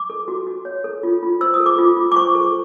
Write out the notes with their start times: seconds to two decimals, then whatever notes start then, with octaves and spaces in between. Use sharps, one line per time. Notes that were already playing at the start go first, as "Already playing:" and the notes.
Already playing: D6
0.10 A4
0.28 F#4
0.47 F#4
0.65 C#5
0.84 A4
1.03 F4
1.23 F4
1.41 C5 E6
1.54 D#6
1.60 A4
1.66 D6
1.78 F4
1.97 F4
2.12 D6
2.16 C5 C#6
2.35 A4